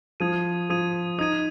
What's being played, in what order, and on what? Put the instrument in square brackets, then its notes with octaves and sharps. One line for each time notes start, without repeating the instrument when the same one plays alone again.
[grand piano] F3 [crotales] D#6 G#6 D#7
[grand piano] F3 [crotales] D#6 G#6 D#7
[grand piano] D#4 [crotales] D#6 G#6 D#7